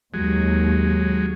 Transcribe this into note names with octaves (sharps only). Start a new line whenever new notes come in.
D#2 F#3 G#3